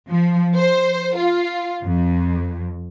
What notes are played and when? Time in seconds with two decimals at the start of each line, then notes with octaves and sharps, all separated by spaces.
0.11 F3
0.56 C5
1.17 F4
1.84 F2